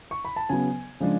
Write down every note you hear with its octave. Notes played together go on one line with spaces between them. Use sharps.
C#6
B5
A5
C#3 F#3 B3 G#5
C#3 F3 G#3 D4